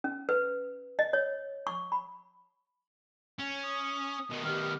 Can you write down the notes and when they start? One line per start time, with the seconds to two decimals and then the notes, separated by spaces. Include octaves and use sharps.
0.04 C#4
0.29 B4
0.99 D#5
1.13 C#5
1.67 C#6
1.92 B5
3.39 C#4
3.63 D#6
4.30 B2 D#3
4.45 D#3 B3 G4 F6